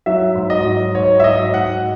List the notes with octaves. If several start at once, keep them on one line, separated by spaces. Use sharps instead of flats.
F#3 E5
G#2
D#5
F#3
G#2 C#5
E5
F#3 D#5
G#2 F#5